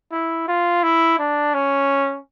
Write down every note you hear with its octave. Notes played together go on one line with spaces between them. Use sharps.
E4
F4
E4
D4
C#4